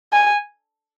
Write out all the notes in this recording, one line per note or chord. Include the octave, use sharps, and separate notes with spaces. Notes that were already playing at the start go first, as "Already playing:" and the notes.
G#5